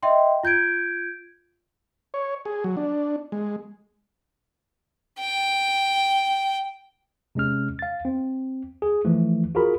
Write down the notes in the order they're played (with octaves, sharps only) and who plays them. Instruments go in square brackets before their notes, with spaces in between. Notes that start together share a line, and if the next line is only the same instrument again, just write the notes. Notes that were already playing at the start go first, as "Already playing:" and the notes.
[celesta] D#5 E5 G5 C6
F4 G6 G#6 D7
[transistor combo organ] C#5
G#4
F#3
D4
G#3
[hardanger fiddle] G5
[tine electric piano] C3 G#3 C#4 F6
F5 A6
C4
G#4
E3 F3 A3
F4 F#4 G#4 A#4 B5